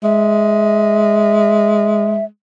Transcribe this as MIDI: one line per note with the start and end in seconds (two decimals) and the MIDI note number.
0.03 2.25 56
0.03 2.24 76